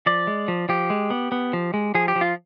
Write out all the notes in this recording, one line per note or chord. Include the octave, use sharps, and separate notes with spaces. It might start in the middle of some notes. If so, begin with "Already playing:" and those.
F3 D5
G#3
F3
F3 G4
G#3
B3
B3
F3
G#3
F3 G#4
G4
F3
F4